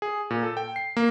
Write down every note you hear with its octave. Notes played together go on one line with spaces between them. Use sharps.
G#4
A#2
A4
G5
C7
A#3